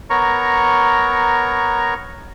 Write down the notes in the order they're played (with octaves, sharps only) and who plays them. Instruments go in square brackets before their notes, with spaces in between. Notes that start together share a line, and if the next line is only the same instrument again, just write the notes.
[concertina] B3 A#4 C#5 A#5 C#6